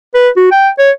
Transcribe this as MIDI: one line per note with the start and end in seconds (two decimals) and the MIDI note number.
0.14 0.29 71
0.37 0.47 66
0.51 0.68 79
0.79 0.91 73